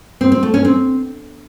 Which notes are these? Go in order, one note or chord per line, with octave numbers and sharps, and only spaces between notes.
C4
C4
A3
C#4
C4